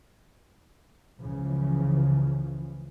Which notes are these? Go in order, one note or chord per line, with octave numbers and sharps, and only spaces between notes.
C#2 C#3 E3 F3